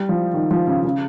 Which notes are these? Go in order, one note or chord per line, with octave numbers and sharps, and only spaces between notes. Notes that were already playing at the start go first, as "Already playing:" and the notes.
Already playing: G3
F3
D#3
F3
C#3
C#3